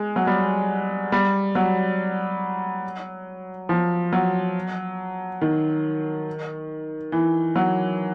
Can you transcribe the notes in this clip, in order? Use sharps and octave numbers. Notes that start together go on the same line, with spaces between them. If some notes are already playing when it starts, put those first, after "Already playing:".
Already playing: G#3
F#3
G3
G3
F#3
F3
F#3
D#3
E3
F#3